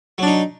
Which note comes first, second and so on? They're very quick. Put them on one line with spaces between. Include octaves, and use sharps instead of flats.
F#3 D4 D#4